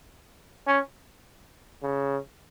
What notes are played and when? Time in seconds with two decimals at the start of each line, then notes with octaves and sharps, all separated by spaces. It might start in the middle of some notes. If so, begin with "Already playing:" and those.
0.67 C#4
1.83 C#3